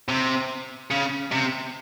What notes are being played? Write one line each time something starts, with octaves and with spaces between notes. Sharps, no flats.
C3
C#3
C3